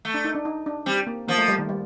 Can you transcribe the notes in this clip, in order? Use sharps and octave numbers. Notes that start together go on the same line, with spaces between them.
A3
D4
D#4
D4
D#4
D4
G3 C4
A#3
F3 A#3
A3
G3
D#3
G3